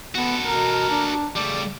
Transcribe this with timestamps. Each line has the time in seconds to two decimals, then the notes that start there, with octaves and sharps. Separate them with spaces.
0.15 B3 F#4 A4
0.45 B2 A#4
0.90 D4
1.36 C#3 G3 A3 D5